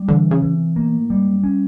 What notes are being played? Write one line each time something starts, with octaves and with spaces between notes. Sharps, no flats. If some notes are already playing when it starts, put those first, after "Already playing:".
Already playing: G3
D3 E3
C#3
E3
C3
B2 A#3
A2
G#2 G3
F#2
C#4